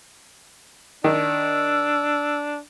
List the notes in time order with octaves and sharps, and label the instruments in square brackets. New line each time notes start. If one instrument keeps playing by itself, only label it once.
[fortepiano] D#3 [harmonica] D4 [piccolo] E6